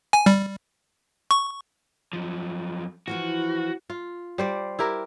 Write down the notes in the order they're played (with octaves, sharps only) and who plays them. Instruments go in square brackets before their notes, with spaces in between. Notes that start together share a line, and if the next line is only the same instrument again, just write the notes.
[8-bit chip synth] G#5
G3
C#6
[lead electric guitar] F#2 F3
[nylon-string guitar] E3 F3 B3 [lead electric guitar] F#4
[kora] F4
G3 C5 D5
E4 G4 A#4